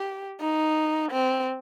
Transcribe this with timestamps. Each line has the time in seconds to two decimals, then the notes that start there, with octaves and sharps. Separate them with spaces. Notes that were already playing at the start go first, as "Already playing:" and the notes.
Already playing: G4
0.40 D#4
1.12 C4